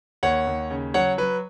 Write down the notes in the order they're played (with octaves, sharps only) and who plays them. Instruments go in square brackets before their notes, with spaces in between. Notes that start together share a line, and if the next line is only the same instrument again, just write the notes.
[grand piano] D#2 C#5 F#5
D#2
C#3
F#3 C#5 F#5
F#3 B4